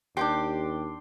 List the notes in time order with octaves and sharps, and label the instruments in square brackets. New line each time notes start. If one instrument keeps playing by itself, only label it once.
[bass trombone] D#2 [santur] D4 G5 C6 [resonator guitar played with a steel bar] G4